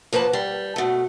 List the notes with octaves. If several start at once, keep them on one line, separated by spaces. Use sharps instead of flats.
F3 A#3 B4 G#5 A5
G3
B2 A3